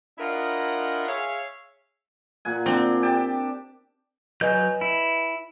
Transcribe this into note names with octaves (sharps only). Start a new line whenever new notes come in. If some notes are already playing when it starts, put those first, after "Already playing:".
D4 E4 F4 A#4 D#5 F#5
G#4 C#5 E5 F5
A#2 F#5 G#5
C4 D4
G4 G5 A5
F#3 B4 D#5 G#5 G6
E4